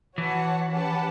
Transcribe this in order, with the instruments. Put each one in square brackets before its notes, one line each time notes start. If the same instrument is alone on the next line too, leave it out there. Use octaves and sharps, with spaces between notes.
[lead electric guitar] E3 [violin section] F#4 C#5 F#5 A5
[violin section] C#4 G4 B4 F#5 A5